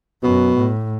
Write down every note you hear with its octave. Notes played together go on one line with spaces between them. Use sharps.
F#2 B2
A2